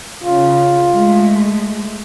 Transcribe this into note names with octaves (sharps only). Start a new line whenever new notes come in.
C#3 F4
G#3 A3